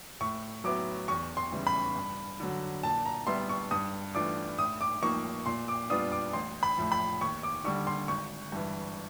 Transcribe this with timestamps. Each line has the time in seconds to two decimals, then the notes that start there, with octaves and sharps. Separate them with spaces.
0.20 A2 C#6
0.64 F#3 B3 E4 D6
1.08 E2 C#6
1.37 C6
1.52 C#3 E3 G3
1.67 B5
1.96 G2
2.40 D3 F#3
2.83 A#2 A5
3.06 A#5
3.27 G3 B3 E4 C6
3.49 C#6
3.71 G2 D#6
4.15 E3 A3 D4 F4 D6
4.58 A2 D#6
4.81 D6
5.02 F3 A#3 D#4 C#6
5.46 A#2 C6
5.68 D6
5.90 G3 B3 D4 F4 D#6
6.12 D6
6.33 A1 C6
6.63 B5
6.78 A2 F3
6.92 B5
7.21 D#2 C#6
7.43 D6
7.64 D3 G3 C#6
7.87 C6
8.08 G#1 C#6
8.52 G2 E3